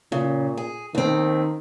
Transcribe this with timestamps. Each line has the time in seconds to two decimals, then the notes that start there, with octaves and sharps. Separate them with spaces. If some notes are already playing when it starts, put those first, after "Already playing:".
0.12 A#2 C#3
0.57 G#4
0.95 D#2 D#3 C4